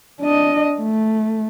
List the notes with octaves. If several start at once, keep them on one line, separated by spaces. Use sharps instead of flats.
D4 D#5
A3